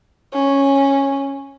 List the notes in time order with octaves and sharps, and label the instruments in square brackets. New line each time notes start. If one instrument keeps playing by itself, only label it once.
[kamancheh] C#4